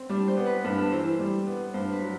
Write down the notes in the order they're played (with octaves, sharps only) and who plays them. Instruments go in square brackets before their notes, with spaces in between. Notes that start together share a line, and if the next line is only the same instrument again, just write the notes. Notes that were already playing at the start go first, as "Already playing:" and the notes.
Already playing: [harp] C4
[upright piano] G3 [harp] D4
[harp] C5
[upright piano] B3
[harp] B4
[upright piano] G2 [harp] A4
[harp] A4
[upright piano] E3 [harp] C5
[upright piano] G3
B3
[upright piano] G2 [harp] C5
[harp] B4
[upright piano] F#3